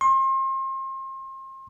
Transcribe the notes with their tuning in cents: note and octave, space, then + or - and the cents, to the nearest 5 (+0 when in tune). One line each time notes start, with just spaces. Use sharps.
C6 +35